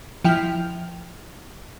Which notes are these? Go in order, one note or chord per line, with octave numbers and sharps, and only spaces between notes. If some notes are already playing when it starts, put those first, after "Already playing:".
F3 E4 G5 F6